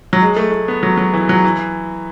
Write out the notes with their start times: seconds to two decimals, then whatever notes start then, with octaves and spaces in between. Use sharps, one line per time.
0.13 F#3
0.22 G#3
0.36 A3
0.52 A3
0.68 B3
0.83 F#3
0.97 F#3
1.14 E3
1.29 F#3
1.44 E3